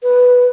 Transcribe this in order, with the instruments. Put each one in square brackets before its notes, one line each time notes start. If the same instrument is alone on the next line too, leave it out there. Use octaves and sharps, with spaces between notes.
[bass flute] B4